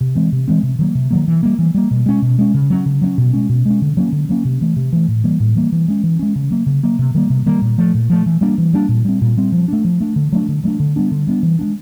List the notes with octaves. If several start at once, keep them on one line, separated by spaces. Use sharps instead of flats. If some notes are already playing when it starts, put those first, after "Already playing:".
C3
E3 G#3 C4
C3
E3 G#3 C4
C3
D#3 F#3 A#3
C3
D#3 F#3 A#3
E3
G3 A#3
E3
G3 A#3
B2
G#3 C#4
B2
G#3 C#4
C#3
F#3 A#3 C#4
C#3
F#3 A#3 C#4
B2
G#3 C#4
B2
G#3 C#4
D3
F#3 A#3 C#4
D3
F#3 A#3 C#4
C3
E3 A3
C3
E3 A3
A2
E3 G3 A#3
A2
E3 G3 A#3
E3
G#3 C#4
E3
G#3 C#4
C#3
F#3 A#3
C#3
F#3 A#3
C3
D#3 G3 A#3
C3
D#3 G3 A#3
A#2
F3 A3
A#2
F3 A3
E3
G3 A#3 D4
E3
G3 A#3 D4
A#2
G3 C4
A#2
G3 C4
F3
A3 D4
F3
A3 D4
D3
F#3 A3 D4
D3
F#3 A3 D4
D3
G3 B3 D4
D3
G3 B3 D4
E3
G#3 B3 D4